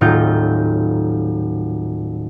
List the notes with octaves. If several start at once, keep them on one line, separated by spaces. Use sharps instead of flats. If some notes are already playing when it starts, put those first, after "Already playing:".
D#1 A2 F#3 D#4 F4 G6